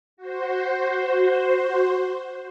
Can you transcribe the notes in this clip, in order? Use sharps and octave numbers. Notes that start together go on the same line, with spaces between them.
F#4 C5